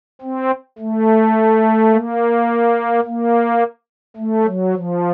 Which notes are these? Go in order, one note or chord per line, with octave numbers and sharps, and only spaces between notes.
C4
A3
A#3
A#3
A3
F#3
F3